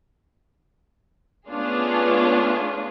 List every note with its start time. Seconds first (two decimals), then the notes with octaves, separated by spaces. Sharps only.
1.50 A3 B3 C#4 D4 F4 G#4